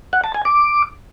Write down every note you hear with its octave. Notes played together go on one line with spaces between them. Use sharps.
F#5
A5
G#5
D6